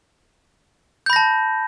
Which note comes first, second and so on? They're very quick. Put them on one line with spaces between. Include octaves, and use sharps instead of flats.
G6 B5 A#6 A5